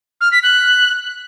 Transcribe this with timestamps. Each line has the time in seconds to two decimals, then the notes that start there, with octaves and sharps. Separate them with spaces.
0.21 F6
0.32 B6
0.43 F#6